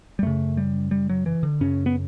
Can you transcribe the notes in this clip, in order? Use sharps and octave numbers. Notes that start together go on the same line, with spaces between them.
G3
F#2 C#3 A3
G3
G3
F#3
E3
D3
F#2 C#3 C#4
B3